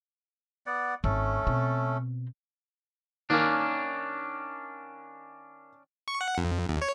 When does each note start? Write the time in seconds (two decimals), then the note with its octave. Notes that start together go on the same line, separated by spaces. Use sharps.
0.66 B3 D5 F#5
1.04 G#1 A3 C#4 A4
1.47 B2 C4
3.30 D#3 A#3 C#4 D4
6.08 C#6
6.21 F#5
6.38 F2
6.69 D#2
6.81 C#5